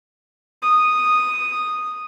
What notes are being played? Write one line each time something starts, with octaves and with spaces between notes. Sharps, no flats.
D#6